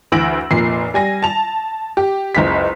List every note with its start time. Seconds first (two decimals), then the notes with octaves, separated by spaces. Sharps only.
0.12 D2 E3 E6 A#6 D7 F#7
0.51 F1 A#2 C7
0.94 G3 G#5 A#6
1.23 A5 F7
1.97 G4
2.35 F#1 C#2 B6